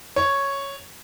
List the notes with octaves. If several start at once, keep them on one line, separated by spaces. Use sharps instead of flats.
C#5